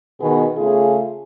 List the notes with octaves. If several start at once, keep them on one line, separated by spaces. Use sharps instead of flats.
B2 D#3 B3 G#4
C#3 A3 F4 G#4